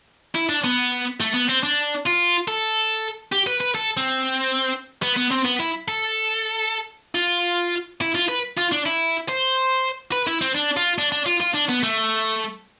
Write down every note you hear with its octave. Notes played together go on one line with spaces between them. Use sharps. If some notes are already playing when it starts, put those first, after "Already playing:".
E4
D4
B3
A3
B3
C4
D4
F4
A4
G4
B4
B4
A4
C4
B3
B3
C4
B3
E4
A4
F4
E4
F4
B4
F4
D4
E4
C5
B4
E4
C4
D4
F4
D4
D4
F4
F4
D4
B3
A3